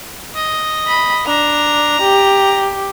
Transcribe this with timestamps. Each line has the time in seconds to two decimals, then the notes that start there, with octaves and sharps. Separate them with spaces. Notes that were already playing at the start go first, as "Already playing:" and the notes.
0.35 D#5
0.87 B5
1.26 D4 A#5
2.02 G4